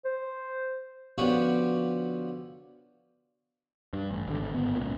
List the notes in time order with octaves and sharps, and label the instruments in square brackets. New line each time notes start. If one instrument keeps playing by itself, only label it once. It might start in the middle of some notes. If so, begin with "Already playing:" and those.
[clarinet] C5
[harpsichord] D3 F3 B3 C#4 F#4 G4
[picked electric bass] G2
A1
G#1 B2 D3
G#1 B3
C#2 A#2